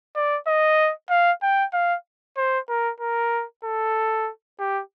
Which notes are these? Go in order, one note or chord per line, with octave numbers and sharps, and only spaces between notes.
D5
D#5
F5
G5
F5
C5
A#4
A#4
A4
G4